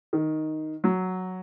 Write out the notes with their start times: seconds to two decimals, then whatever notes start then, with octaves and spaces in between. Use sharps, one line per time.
0.13 D#3
0.84 F#3